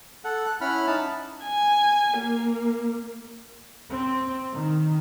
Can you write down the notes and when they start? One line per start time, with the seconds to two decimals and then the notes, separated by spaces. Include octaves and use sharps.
0.24 A4 F#5
0.46 F#6
0.61 C#4 E4 F#5 B5 F6
0.87 D#4 A5
1.44 G#5
2.18 A#3
3.90 C4
4.53 D#3